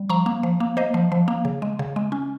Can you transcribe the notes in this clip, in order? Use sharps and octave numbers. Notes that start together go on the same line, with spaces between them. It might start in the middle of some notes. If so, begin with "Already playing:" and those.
Already playing: G3
F3 A#5 C#6
A#3
F3
A#3
A#3 C5 D#5
F3
F3
A#3
C#3
G#3
C#3
G#3
C#4